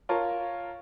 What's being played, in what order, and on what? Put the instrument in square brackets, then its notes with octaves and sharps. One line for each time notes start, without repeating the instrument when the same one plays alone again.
[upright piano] F4 A#4 C#5 A5